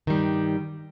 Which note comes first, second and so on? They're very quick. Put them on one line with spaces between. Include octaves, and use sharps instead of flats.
D#3 G3 G2